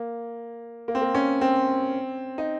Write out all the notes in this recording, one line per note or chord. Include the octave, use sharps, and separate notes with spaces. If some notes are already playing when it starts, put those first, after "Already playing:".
Already playing: A#3
A#3
C4
A#3
C#4
C4
D#4